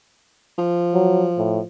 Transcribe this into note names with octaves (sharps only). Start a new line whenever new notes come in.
F3
F#3
A2